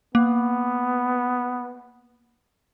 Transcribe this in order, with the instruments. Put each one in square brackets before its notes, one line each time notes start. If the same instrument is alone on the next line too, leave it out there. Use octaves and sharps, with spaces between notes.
[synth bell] A#3 [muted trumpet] B3